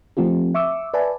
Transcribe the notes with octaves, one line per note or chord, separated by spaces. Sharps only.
F3 A3 C4 F4 G4
E5 C#6 D6 E6
B4 D5 E5 G#5 A5